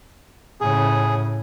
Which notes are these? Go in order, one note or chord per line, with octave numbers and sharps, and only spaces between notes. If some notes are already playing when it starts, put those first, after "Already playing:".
A2 C#3 G#4